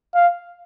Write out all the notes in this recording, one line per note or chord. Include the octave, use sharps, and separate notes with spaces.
F5